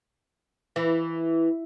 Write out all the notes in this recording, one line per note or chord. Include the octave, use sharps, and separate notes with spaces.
E3